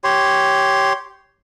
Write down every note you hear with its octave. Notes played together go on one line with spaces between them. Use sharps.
G4 C#5 C6